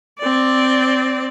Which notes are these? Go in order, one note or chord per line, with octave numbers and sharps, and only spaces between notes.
C4 D5